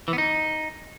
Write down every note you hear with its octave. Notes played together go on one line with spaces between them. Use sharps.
E3
B3
D#4